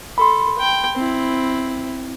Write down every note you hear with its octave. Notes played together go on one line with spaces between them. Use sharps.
A4 B5 C6
G5
C4 E4